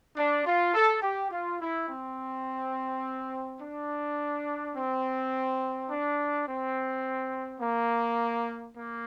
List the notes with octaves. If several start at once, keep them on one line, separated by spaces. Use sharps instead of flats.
D4
F4
A4
G4
F4
E4
C4
D4
C4
D4
C4
A#3
A#3